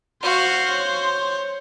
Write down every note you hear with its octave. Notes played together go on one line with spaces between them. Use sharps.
F#4 C5 F5
C#5